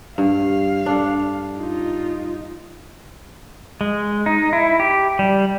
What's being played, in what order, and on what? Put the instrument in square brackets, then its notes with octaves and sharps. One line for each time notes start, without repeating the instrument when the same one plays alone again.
[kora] G2 [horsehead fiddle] F5
[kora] D4 A4
[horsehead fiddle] D#4 F4
[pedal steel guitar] G#3
D#4
E4
G4
G3